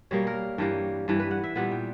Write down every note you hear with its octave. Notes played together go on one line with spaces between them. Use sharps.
B2 G3 A#3 C#5
A#4
G2 E3 G3 A#3 G5
G2 E3 G3
B4
F#5
E5
A#2 G3 B3 F#5
G5